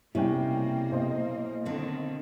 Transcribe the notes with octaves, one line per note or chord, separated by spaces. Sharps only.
B1 C3 G3 A#3 C#4 E4 G5
B1 C5 D#5
D3 D#3 C4